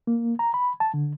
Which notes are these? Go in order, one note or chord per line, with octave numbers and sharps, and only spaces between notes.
A#3
A#5
B5
A5
D3